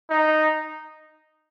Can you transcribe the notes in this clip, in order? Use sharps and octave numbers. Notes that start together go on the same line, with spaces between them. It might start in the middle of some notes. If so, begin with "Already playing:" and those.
D#4